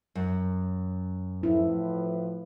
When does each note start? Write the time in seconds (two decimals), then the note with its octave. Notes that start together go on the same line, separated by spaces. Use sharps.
0.15 F#2
1.43 A2 F3 E4 B4